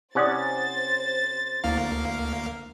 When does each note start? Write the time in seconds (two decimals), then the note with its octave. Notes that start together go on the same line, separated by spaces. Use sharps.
0.15 C3 C#4 E4 C5 D5 F#5 D#6 A6
1.64 D2 A#3 E4 F5